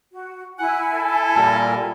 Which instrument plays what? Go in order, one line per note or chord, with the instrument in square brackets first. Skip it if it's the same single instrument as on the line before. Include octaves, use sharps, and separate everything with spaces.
[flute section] F#4
[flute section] E4 G#5 [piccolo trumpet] F#5
[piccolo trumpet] A4
[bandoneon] A#2 G3 A#4 [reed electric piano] A5